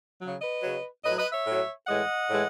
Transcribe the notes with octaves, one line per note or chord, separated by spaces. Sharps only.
F#3
C#3
B4 D#5
C#3 F#3
A2 F#3 B4 D#5
B4 D#5
C#5 E5
A2 F#3
A2 E3 G#3 D#5 F#5
A2 E3 G#3